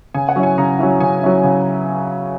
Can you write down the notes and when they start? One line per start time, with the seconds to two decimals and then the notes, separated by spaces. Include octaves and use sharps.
0.14 C#3 G#5
0.29 F#5
0.36 F#3 C#4 E4
0.43 G#5
0.58 C#3 A#5
0.79 F#3 C#4 E4
1.00 C#3 G#5
1.22 F#3 C#4 E4
1.44 C#3